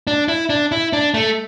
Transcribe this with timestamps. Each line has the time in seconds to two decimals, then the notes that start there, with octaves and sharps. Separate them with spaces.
0.07 D4
0.28 E4
0.50 D4
0.72 E4
0.93 D4
1.14 A3